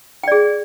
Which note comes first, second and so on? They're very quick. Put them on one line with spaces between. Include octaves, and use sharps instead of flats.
G5 D5 G#4